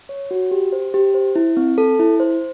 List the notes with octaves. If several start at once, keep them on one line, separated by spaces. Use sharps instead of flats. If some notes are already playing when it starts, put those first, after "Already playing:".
C#5
F#4
G4
C5
G4
C5
E4
C4
A4
E4
C5